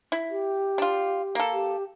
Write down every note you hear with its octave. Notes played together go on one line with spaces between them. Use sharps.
E4
G4
D4 F4
A#3 A4
G4